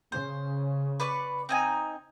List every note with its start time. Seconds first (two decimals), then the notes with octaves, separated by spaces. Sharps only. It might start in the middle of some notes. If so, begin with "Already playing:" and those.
0.12 C#3 C5
1.00 B4 D5 C#6
1.49 C4 D#4 G#5